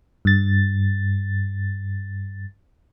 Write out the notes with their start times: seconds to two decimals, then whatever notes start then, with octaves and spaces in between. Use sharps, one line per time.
0.25 G2 A6